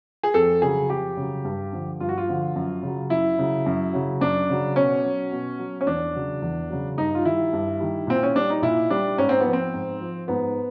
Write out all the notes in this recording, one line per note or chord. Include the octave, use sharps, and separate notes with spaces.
G#4
F2 A4
C#3 F#3 G#4
F2 G4
C#3 F#3
G2
D3 F3
G2 F4
F#4
F4
D3 F3
F#2
C#3 F#3
F#2 E4
C#3 F#3
F#2
C#3 F#3
F#2 D4
C#3 F#3
B2 C#4
F#3
B2
F#3
C#4
E2 D4
C#3 F#3
E2
C#3 F#3
G2 D#4
F4
D#3 G3 E4
G2
D#3 G3
A#2 C4
C#4
G3 D4
D#4
A#2 E4
G3 D4
G#2 C#4
C4
B3
F3
C4
G#2
F3
G#2 B3